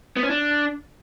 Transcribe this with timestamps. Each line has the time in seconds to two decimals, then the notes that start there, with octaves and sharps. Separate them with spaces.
0.17 B3
0.23 C#4
0.30 D4